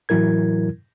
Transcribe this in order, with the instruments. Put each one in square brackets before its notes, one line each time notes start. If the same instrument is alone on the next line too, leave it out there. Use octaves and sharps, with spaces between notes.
[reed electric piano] A2 E3 F#3 E4 A#4 G#6